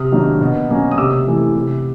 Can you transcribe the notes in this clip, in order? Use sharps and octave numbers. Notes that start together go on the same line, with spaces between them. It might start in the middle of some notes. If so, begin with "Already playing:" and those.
Already playing: C3 D#6 F6
D#3 F#3 A#3 D4
B2
F#3 A#3 C#4
D#6
C3 D6 E6
E3 A3
C3